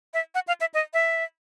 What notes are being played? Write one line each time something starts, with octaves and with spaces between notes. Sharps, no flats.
E5
F#5
F5
E5
D#5
E5